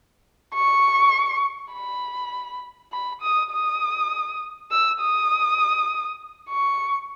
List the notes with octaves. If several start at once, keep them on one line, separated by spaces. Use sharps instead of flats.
C#6
B5
B5
D#6
D#6
E6
D#6
C#6